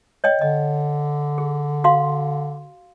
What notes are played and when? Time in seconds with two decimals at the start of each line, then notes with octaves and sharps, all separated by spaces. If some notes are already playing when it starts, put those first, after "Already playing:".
0.24 C#5 D#5 G5
0.41 D3 D#5
1.38 G#4
1.84 F#4 F5 C6